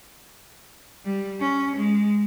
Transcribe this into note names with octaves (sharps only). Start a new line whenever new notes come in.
G3
C#4
G#3